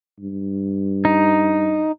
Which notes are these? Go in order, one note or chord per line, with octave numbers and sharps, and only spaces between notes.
G2
D#4